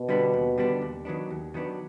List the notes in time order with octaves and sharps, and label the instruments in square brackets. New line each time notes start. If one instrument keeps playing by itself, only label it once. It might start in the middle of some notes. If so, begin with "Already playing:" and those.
Already playing: [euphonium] B2
[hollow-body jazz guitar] D3 G3 B3 D4
D#2
D3 G3 B3 D4
D#2
D#3 F#3 B3 D4
D#2
D#3 F#3 B3 D4